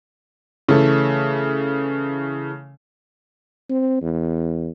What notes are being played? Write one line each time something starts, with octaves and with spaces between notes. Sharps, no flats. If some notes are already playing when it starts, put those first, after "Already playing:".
C#3 E3 A3
C4
E2